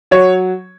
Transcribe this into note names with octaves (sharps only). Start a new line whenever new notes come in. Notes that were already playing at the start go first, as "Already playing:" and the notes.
F#3 C#5